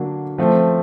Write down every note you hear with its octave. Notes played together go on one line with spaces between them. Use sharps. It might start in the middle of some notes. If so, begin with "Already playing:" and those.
Already playing: D3 F#3 A#3 D4
F3 A3 C4